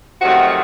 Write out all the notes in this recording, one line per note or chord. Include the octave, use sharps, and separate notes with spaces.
F2 C3 D#3 F#3 A3 F#4